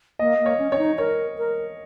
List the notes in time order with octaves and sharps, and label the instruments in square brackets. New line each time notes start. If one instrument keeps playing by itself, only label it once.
[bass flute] A#3 [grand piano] D#5
[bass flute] A#3
[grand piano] C#5
[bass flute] C#4
[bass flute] C#4 [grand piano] C#5
[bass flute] D#4
[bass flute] A#4 [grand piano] C#5
[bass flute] A#4